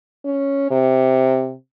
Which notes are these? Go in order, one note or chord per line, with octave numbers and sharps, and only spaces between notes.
C#4
C3